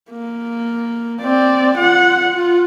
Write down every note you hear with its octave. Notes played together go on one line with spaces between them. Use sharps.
A#3
C4 D5
F4 F#5
F4